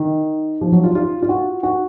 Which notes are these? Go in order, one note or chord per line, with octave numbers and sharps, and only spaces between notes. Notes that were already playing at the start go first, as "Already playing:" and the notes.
Already playing: D#3
F3
F#3
F4
F4
F4
F#4
F#4